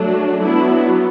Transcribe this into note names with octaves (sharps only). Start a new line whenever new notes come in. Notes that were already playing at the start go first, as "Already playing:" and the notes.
Already playing: F#3 A3 D4
F#3 B3 D4 E4